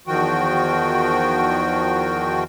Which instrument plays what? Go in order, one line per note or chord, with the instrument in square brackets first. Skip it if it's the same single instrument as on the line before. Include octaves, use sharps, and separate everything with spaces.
[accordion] E2 D#3 F3 F#4 G5